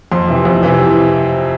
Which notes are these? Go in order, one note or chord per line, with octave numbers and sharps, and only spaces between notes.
F2 C6
C3 E3
F2
C3 E3